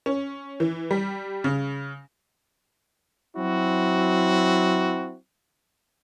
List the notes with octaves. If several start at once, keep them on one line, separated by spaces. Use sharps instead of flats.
C#4
E3
G3
C#3
F#3 C4 E4 F#4